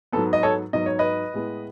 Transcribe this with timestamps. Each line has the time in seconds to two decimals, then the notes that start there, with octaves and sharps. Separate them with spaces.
0.12 G#2 F#3 B3 A4
0.33 D#5
0.43 A4 C#5
0.73 G#2 F#3 B3 D#5
0.86 C#5
0.99 B4 D#5
1.33 A2 G#3 B3